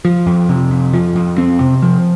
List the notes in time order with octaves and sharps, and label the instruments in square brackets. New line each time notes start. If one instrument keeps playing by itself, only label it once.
[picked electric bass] F3
F2
C3
F2
F3
F2
C4
C3
F3